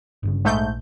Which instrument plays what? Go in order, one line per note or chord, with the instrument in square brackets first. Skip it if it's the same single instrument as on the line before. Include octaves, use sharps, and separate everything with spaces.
[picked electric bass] G1 G2 C#3
[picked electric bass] A#1 [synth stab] G#2 A3 G6